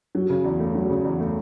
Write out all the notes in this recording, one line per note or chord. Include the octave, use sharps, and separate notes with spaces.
F#3
C#3
E2
A3
F#3
C#3
E2
A3